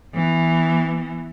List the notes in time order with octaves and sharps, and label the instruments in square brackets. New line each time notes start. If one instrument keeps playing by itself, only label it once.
[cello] E3 B3